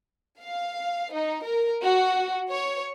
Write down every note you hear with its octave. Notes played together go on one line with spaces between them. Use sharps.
F5
D#4
A#4
F#4
C#5